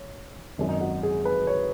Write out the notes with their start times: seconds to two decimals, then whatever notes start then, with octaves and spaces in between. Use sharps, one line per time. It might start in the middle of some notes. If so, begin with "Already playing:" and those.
Already playing: C#5
0.58 G#1 F#2 F#3
0.69 D#4
0.81 F#4
1.03 G#4
1.25 B4
1.47 C#5